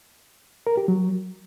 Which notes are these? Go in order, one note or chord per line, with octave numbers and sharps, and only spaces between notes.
A#4
G4
F#3